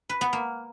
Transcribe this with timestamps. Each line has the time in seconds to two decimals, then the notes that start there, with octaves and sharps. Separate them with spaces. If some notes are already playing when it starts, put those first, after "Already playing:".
0.09 B4
0.21 B3
0.33 A#3